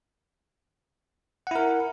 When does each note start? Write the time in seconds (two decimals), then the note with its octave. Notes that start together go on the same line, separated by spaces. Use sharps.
1.47 F#5
1.51 E4
1.55 A#4